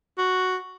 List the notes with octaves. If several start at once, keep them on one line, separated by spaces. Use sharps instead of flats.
F#4